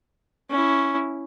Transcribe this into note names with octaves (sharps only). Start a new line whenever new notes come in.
C#4 E4